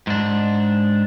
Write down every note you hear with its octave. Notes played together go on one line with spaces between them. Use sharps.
G#2 D4